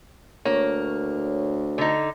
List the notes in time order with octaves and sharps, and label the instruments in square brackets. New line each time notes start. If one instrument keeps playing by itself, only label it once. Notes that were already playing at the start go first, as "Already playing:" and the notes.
[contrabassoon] D2 [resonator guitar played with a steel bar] A#3 [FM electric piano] C#5
[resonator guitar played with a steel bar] D3 D#4